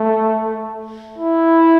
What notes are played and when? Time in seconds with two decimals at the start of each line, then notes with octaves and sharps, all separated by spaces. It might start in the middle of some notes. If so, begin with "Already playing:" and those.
Already playing: A3
1.18 E4